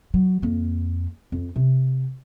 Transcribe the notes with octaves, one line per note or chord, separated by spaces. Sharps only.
F#3
F2 A#3
F2
C3